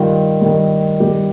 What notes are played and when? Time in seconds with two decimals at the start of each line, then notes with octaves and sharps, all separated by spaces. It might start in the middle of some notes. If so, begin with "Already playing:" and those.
Already playing: G2 D#3 F4
0.41 G2 D#3
1.00 G2 D#3 G4